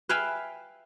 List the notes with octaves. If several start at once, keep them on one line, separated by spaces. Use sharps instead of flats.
B4 E5 F5 G5 G#5 B5